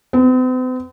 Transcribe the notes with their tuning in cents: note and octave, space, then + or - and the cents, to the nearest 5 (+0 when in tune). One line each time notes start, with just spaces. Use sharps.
C4 -45